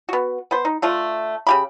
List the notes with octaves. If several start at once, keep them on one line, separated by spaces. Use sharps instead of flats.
B3 F#4
B3 C5
D#4
D3 A3 F4
C#3 G4 B5